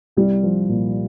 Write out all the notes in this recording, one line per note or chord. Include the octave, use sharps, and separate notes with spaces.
C2 G3
F3
A#2